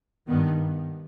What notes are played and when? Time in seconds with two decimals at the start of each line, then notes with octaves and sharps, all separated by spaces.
0.28 G2 D#3 B3